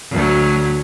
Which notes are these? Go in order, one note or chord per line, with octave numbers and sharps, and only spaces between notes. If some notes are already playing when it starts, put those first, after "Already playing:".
D2 F#3